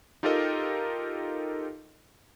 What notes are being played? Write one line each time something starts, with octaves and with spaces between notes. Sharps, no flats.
D#4 F4 G4 A4 A#4 D#5